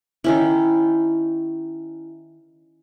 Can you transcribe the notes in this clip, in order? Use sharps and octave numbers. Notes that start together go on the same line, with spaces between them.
D#3 C#4 E4